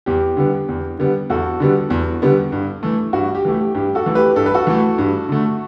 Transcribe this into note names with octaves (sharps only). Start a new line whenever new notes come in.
E2 G4
D3 G3 B3
E2
D3 G3 B3
E2 F#4 A4
D3 G3 B3
E2
D3 G3 B3
G2
E3 A3
G2 F#4
G4
E3 A3
G4
G2 G4
F#4 A4
E3 A3
G4 B4
G2 A4
B4
F#4 A4
E3 A3
G2
D3 A3